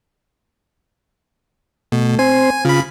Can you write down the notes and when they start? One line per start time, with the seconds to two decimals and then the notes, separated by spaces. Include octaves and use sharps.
1.92 B2 A3
2.19 C4 C5 G#5
2.65 C#3 F4 B5